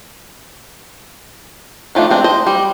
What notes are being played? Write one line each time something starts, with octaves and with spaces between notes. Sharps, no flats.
D#3 F3 A3 D4
G#3 C4 D4
C5 D#5
G3